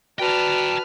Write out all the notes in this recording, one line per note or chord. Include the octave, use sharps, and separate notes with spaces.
F#4 B4 D5 G5 A5 A#5 F6